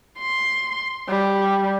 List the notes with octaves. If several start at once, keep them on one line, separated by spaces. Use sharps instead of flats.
C6
G3